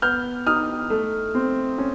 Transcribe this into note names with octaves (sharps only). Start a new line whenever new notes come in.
B3 F6 G6
D#4 D#6 F6
A3
C4
C#4